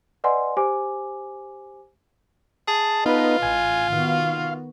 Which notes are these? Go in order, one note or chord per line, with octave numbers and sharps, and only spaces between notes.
B4 D5 D#5 F#5 G#5 C6
G4 C5 G#5 D6
G#4 A5
B3 D#4 F4 A4 B4 D#5
A1 G#5
D#3 B3 F#4 F5